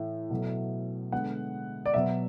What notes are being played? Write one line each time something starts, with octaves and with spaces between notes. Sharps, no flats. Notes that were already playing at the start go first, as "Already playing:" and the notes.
Already playing: A2 E3 A3
B2 F#3 A3
D3 G#3 B3 F#5
D5
B2 F#3 B3 E5